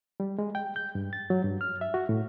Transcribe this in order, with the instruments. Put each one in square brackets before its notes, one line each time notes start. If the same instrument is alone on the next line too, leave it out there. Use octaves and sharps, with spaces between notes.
[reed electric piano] G3
G#3
G5
G6
G2
A6
F#3
G2
F6
E5
F#4
A2